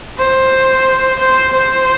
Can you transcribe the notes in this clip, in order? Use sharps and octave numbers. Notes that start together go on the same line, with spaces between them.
C5
C5
C5